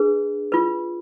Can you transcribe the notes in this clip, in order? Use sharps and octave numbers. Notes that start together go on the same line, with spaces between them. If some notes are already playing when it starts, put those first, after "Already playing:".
Already playing: D4 G#4 B4
F4 B4